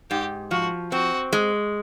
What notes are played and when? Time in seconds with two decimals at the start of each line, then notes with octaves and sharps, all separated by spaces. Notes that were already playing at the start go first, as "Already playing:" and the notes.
0.10 G#2 G4
0.51 F3 F#4
0.92 C4 F#4
1.33 G#3